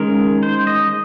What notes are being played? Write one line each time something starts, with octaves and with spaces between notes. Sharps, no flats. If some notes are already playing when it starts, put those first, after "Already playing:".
Already playing: D#3 G#3 C#4 A#4
C5
D#5